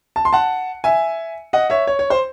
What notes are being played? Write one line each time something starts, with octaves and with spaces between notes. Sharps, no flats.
A5
C6
F#5 A5
E5 G#5
D#5 F#5
C#5 E5
C#5
C#5
C5